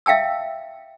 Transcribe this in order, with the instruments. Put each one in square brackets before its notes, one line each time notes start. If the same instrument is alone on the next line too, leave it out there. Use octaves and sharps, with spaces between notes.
[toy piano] E5 F5 G5 A5 E6